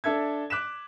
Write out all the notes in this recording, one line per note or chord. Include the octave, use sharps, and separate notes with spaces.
D4 A4 E5 G#6
D6 F#6 B6 E7